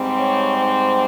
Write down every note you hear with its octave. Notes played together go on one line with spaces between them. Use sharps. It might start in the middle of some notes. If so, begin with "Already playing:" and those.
Already playing: G#2 G3 C4
C#5
C5